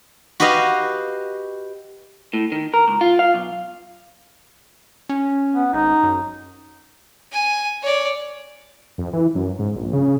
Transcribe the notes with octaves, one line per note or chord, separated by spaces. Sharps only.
F#4 G4 B4 D#5 F5
A2
D#3
A#4
C#2
F4
F5
B1
C#4
B3
G#1 D#4
F#2
G#5
C#5 D5
F2
E3
F#2
G#2
A#1
C#3